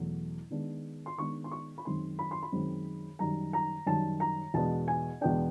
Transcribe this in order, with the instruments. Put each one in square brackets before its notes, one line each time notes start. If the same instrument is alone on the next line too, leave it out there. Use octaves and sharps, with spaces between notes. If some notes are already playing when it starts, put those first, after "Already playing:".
Already playing: [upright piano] E2 B2 F#3 A3
D#3 G#3 B3 D4
C6
D#3 G#3 B3 D4 C#6
C6
C#6
B5
F#2 D#3 G#3 C4 C6
B5
C6
B5
F#2 D#3 G#3 C4
F#2 D#3 G3 A#5
A#5
F#2 D#3 G3 A5
A#5
E2 B2 G#3 B3 D4 A5
G#5
E2 B2 G#3 B3 D4 G5